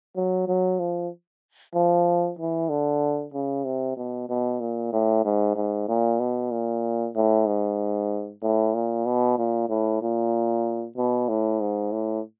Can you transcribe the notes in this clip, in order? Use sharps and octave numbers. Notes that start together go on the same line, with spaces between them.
F#3
F#3
F3
F3
E3
D3
C#3
C3
B2
B2
A#2
A2
G#2
G#2
A#2
B2
A#2
A2
G#2
A2
A#2
B2
A#2
A2
A#2
B2
A2
G#2
A2